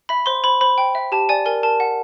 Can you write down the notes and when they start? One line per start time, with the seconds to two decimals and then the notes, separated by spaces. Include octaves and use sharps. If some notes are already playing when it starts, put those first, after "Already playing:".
0.09 E5 B5
0.26 C5 C6
0.44 C5 B5
0.61 C5 B5
0.78 G5
0.95 E5
1.12 G4 A5
1.29 D5 G#5
1.46 A#4 G#5
1.63 A#4 A5
1.80 F#5